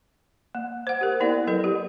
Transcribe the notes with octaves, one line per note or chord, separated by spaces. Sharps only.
A#3
C5 F#5
G4 A#4
A#3 B3 E4 A#4 D5
F#3 E4 A4 B4
G4